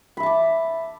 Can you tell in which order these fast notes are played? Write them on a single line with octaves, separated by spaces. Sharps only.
B5 E5 A5 D6